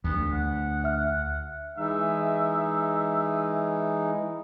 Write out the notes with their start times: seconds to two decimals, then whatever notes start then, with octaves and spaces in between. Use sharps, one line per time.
0.04 D2 B3
0.33 F#5
0.84 E5 F6
1.78 E3 G#3 D#4 E5